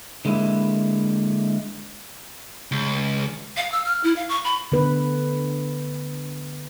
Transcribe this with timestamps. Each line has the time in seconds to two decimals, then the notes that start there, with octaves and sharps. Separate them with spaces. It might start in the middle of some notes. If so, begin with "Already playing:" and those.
0.25 D3 G#3 A#3 E4
2.71 C#2
3.57 F5
3.72 E6
3.85 F6
4.03 E4
4.16 F5
4.29 C#6
4.44 B5
4.72 D3 B3 B4